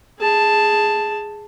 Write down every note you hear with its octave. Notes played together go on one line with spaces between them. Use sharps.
G#4 A5